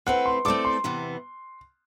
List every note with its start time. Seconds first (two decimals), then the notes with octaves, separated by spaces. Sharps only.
0.06 A3 C4 E4 B4 F#5
0.26 C6
0.45 A3 C4 E4 A4 D5 D6
0.65 C6
0.84 E2 C3 E3 B3